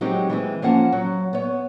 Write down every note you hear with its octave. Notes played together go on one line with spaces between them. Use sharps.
F#3 G#3 C4 D#4 G4
E3 G#3 C4
F3 A#3 C#4 F#5 A5
F#3
B3 C#5